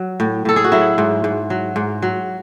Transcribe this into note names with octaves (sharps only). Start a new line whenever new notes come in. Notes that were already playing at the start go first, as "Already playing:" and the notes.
Already playing: F#3
A2
A2 A4
G#4
F#4
F#3 E4
G#2
G#2
F#3
G#2
F#3